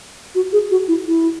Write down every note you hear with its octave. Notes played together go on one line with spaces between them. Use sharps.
F#4
G#4
F#4
E4
E4